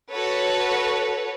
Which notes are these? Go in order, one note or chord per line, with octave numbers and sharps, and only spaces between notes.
F#4 A4 B4 C#5